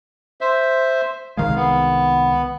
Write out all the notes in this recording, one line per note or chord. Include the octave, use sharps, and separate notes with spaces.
C5 E5
C2 D#3 G#3 F5
B3